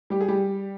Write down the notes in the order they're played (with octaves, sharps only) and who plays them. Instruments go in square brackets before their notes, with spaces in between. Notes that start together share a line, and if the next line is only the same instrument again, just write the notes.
[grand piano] G3 G4
G#4
G3 G4